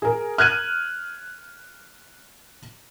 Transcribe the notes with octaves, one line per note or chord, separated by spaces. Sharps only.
G#4 A#4
F6 F#6 G#6 D#7